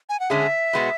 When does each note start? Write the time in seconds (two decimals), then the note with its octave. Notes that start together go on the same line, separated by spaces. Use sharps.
0.09 G#5
0.20 F#5
0.30 D3 G#3 C#4 G#4 E5
0.73 B2 G#3 B3 F#4